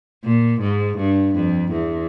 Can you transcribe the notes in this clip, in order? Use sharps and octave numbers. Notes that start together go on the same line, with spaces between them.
A#2
G#2
G2
F2
E2